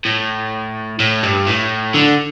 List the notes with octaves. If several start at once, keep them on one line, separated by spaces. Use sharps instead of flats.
A2
A2
G2
A2
D3